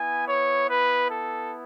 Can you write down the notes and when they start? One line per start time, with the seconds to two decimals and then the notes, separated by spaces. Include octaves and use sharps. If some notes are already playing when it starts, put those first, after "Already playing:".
Already playing: B3 E4 G#5
0.27 C#5
0.69 B4
1.10 A4